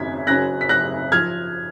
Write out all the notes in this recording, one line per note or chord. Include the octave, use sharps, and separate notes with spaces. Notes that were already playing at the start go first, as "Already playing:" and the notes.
Already playing: G#1 F#2 C#3 G#6 B6
F#1 F#2 C#3 F#3 C#4 F#6 A#6
B6
F#6 A#6
F3 F6 G#6